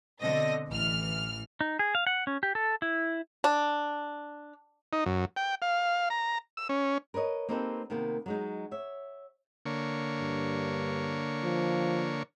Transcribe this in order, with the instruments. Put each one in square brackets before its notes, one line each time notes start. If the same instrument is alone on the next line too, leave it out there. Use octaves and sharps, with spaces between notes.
[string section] B2 D3 C4 D#5 A#6
A1 E3 F6
[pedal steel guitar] D#4
G#4
F5
F#5
C#4
G4
A4
E4
[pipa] D4
[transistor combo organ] D#4
F#2
G5
F5
A#5
E6
C#4
[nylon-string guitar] A#4 B4 C#5 D#5
A#3 C4 D#4 G4 A4 B4
C3 D#3 A#3 B3
F#3 G#3 D#4
C#5 E5
[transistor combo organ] D3 A#3 C#5
[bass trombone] G2
F3